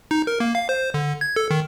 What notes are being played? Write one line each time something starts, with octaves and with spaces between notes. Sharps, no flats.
D#4
A#4
A#3
F5
C5
D3
G#6
A4
D#3